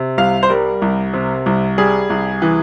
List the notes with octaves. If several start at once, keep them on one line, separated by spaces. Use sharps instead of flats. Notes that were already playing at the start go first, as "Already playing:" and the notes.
Already playing: C3
C2 F5
C5
G3 A#4
C2
C3
C2
G3 G#4
C2
E3